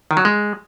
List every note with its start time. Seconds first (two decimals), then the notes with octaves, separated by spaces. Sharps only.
0.11 D#3
0.17 F#3
0.25 G#3